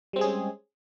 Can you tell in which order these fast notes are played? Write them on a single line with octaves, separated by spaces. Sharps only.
G3 C4 G#3 G#4 C#4